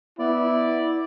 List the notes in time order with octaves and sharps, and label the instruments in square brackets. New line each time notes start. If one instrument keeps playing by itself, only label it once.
[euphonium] B3 [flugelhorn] E4 [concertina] D5